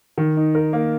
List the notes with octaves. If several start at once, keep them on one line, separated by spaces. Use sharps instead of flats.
D#3
D#4
A#4
A#3